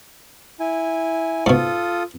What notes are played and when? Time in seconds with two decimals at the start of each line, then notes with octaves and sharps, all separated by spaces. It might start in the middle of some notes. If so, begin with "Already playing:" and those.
0.60 E4 G#5
1.46 G#2 B2 F4 A4 D#6